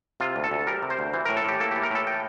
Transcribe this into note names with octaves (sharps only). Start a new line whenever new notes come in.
C3 F4
D2
A4
D2
G3 A#4
C3
C5
D2
E3 C5
A2 A#4
A4
A2 G4
A#3 A4
E3 G4
A#4
A2 A4
G5